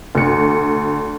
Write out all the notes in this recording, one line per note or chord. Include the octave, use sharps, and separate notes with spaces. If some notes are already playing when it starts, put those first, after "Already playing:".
D2 C#7